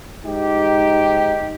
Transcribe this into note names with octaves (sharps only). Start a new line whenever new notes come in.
G#2 D#4 G4